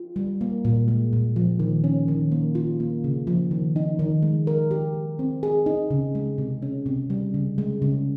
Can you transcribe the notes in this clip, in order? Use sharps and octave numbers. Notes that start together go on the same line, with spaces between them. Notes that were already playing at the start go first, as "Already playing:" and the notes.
Already playing: F4
G3
A#3
A#2
G#3
A#2
F3
D#3
C#4
D#3
A#3
F4
A#3
C#3
F3
D#3
D#4
D#3
G#3
A#4
G4
G#3
C4
G#4
D#4
C#3
G#3
C3
C#4
C3
G3
C#3
G#3
C#3